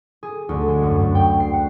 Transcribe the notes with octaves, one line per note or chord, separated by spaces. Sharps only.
G#4
D2
G#3
F#2
F#2
G5
C7
F#5